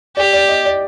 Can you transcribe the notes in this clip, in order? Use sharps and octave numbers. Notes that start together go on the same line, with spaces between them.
G4 D5
D5
D#5
D5